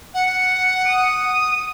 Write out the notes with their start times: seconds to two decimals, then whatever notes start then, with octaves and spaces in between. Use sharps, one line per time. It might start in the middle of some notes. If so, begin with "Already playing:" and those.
0.13 F#5
0.86 D#6